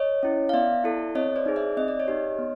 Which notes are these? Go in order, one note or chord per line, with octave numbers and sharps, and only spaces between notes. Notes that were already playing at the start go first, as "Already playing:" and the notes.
Already playing: C#5 D#5
C#4 E4
F5
B3 D5 E5
E4 A4
C4 C#5 D#5
C5 D5
D#4 G#4
D5 E5
C4 D#5
D5
C#5 D#5
D#4 G4
B3